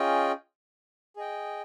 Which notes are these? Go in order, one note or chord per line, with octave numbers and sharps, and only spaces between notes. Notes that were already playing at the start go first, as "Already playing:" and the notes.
Already playing: C#4 F4 G#4 D#5 G5
G#4 D#5 G5